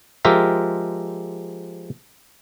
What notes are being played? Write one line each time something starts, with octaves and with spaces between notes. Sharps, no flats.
F3 G#3 F4 G4 A#4 E5